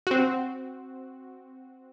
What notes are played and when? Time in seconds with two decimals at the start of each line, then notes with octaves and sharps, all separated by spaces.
0.07 C4 F#4